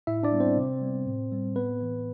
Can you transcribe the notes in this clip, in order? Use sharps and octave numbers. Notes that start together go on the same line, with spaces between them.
A2 E4 E5
D4 D5
G3 B3
C4 C5
C3
G3 B3
A2
G3 C4
A2 B3 B4
E3 B3